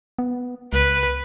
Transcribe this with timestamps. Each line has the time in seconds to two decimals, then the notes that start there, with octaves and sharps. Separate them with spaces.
0.19 B3
0.73 C#2 B4